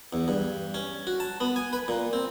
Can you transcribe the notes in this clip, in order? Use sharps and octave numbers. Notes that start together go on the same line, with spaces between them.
E2
G2
C#4
F#4
A5
B3
G#5
B4
A#2
C4